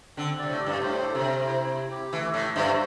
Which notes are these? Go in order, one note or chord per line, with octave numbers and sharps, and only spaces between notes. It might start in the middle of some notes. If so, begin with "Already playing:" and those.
D3 C4
C3 D5
A2
G4
G2
A2 C5
A4
C3
C5
E4
E4
G4
E3 A3
A2 E5
G2 C5